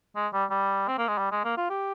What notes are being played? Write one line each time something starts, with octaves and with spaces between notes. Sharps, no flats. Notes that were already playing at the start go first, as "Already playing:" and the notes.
G#3
G3
G3
C4
A#3
G#3
G3
G#3
A#3
F4
G4